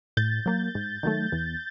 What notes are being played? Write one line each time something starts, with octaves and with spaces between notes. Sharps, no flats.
A2 G6 A6
F#3 A#3
G#2
D#3 F#3 A3
E2